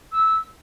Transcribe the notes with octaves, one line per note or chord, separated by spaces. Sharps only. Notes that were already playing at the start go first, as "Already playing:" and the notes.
E6